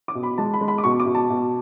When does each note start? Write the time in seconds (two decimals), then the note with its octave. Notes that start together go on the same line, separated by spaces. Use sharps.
0.08 D6
0.15 B2
0.23 B5
0.38 G#3 A5
0.54 B5
0.61 G#3
0.68 B5
0.78 D6
0.84 B2 C#6
1.00 D6
1.06 B2
1.15 A5
1.30 B2